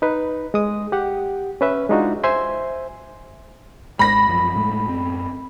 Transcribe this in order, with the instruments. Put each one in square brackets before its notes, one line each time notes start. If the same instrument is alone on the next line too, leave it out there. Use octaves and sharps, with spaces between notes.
[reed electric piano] D#4 B4
G#3 D#6
G4 F#5
C#4 B4 E5
G#3 D4 D#4 F4 F#4
C5 E5 G#5 C6
[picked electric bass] G#1 G#3 [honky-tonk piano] B5 A#6
[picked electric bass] F#2 F3
A2 G#3 A3
F#2 C4